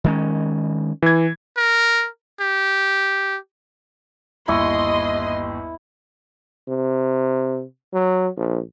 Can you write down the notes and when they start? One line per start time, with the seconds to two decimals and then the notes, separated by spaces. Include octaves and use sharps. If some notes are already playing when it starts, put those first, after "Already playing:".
0.04 D#3 G#3 C#4
1.02 E3 G#6
1.57 A#4
2.41 G4
4.48 G1 D#2 E4 D#5 C6 C#6
6.69 C3
7.93 F#3
8.37 A#1